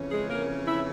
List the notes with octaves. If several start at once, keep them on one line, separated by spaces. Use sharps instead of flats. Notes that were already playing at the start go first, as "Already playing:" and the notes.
Already playing: F2 C#3 E3 C#4
G#3 G#4
A#3 A#4
E4 E5